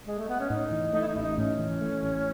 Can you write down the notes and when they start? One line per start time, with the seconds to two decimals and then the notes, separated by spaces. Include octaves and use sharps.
0.07 G#3
0.18 A3
0.29 B3
0.40 C#4
0.49 A2 D#4
0.71 E3
0.93 A3 D#4
1.01 E4
1.08 D#4
1.15 A1 E4
1.22 D#4
1.38 A2 C#4
1.59 E3
1.81 A3
2.03 A1